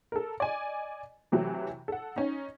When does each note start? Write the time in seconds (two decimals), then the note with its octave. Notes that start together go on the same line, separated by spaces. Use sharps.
0.12 A4 A#4
0.40 D5 D#5 G#5
1.32 C3 E3 F#3 A3
1.88 A4 F#5
2.16 C#4 D#4